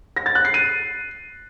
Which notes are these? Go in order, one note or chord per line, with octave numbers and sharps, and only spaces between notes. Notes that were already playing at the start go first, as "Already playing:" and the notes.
A#6
A6
F#6
C7
D#7